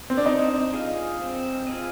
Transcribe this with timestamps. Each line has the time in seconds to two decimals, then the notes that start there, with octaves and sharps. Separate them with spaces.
0.10 C4
0.17 D4
0.26 C4 D#4
0.73 F4 G#4 D#5
1.20 C4
1.67 F4 G#4 D#5